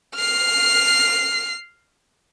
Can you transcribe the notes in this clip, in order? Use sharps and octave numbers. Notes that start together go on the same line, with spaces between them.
F6 C7